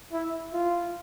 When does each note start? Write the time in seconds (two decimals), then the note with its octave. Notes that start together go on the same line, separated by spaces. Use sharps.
0.12 E4
0.53 F4